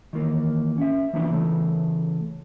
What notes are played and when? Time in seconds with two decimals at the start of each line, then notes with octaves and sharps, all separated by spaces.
0.13 D#3 E3 A#3
0.78 C#4 E5
1.13 E3 F3 A#3 B3 D4 E4
1.30 C#3 E3 A3